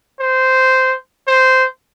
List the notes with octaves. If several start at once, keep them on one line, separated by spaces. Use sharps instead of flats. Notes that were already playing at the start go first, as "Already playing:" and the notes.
C5
C5